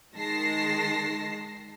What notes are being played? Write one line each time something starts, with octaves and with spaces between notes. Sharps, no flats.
D#3 G#3 A5 A#6 C7